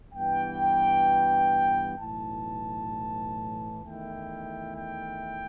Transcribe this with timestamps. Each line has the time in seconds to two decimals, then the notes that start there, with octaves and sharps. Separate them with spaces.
0.14 G2 E3 B3 G5
1.99 B1 A2 E3 A5
3.84 E2 D#3 A3 E4 G5
4.76 G5